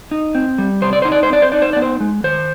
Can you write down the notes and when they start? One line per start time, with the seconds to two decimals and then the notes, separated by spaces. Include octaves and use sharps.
0.11 D#4
0.35 C4
0.58 G3
0.82 C3 C5
0.93 D5
1.02 D#4 C5
1.12 D5
1.23 C5
1.30 C4 D5
1.42 C5
1.52 D#4 D5
1.62 C5
1.73 B3 D5
1.82 C5
2.00 G#3
2.24 D#3 C5